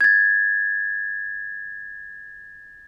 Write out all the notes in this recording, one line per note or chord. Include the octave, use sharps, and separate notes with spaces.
G#6 A6